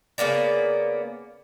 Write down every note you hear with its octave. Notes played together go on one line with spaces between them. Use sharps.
C#3 A#3 B3 D5